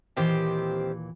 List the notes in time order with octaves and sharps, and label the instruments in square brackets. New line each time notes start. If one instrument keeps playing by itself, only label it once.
[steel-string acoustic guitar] D#2 A#2 E3 [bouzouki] D#3 C4 G4